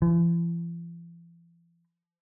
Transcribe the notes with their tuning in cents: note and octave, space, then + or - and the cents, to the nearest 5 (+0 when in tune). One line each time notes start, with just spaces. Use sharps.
E3 +45